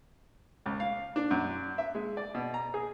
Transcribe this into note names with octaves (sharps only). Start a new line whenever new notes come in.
C#2
F5
D4
F#2
E5
G#3
D5
B2
A#5
G#4